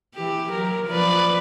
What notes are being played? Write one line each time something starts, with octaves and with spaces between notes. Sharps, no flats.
E3 G4
F#3 A#4
F3 B4 D5